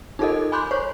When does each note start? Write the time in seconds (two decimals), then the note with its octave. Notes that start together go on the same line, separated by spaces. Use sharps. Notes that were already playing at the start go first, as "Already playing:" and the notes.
0.19 D#4 F4 G4 A4 A#4 D#5
0.52 G#5 B5 C6 D6 F#6 G6
0.71 C5 C#5 C#6